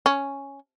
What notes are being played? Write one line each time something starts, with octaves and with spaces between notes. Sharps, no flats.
C#4